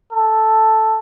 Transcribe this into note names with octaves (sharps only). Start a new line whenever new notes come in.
A4